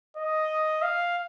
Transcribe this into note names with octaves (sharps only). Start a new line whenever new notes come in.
D#5
F5